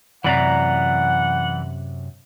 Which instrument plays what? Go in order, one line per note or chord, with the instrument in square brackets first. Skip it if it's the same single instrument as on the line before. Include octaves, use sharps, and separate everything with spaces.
[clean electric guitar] F#2 C3 [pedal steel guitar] E3 D5 A#5 [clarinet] F#5